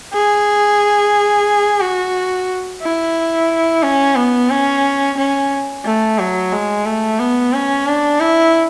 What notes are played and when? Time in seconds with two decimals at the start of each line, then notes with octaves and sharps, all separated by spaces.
0.13 G#4
1.81 F#4
2.82 E4
3.83 C#4
4.17 B3
4.50 C#4
5.18 C#4
5.85 A3
6.19 F#3
6.52 G#3
6.85 A3
7.20 B3
7.53 C#4
7.87 D4
8.20 E4